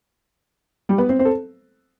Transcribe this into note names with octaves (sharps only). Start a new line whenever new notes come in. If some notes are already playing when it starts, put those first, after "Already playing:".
G3 G4
B3 B4
C4 C5
C4 C5
A4